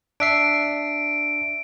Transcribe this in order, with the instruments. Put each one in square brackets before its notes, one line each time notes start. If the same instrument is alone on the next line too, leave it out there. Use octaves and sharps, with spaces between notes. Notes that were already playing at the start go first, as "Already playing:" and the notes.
[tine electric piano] D4 E5 C7 [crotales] D7